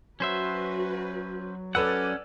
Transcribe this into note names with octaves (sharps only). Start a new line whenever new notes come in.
F#3 C#4 F#4 B4 C5 E5
C#4 A4 B4 D5 F#5 E6